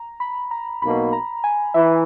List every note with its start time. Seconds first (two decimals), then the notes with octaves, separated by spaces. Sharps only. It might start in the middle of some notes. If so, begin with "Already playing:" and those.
Already playing: A#5
0.20 B5
0.51 A#5
0.82 B1 B2 A#3 B5
1.13 A#5
1.44 G#5
1.74 E3 E5